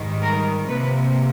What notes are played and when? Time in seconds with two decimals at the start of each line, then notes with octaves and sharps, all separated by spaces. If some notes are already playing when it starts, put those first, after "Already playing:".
Already playing: G#2 D#3 G3
0.22 A#4
0.68 C3 F3 A#3 B4